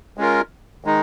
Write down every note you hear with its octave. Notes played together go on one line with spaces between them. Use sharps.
G#3 C#4 F4 A#4
D#3 G#3 D#4